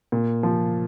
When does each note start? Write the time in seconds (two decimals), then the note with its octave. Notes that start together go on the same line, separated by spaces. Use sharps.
0.12 A#2
0.43 F3